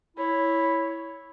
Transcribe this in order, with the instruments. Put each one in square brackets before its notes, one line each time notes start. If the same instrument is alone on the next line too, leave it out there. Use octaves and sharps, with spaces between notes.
[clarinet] E4 [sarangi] C#5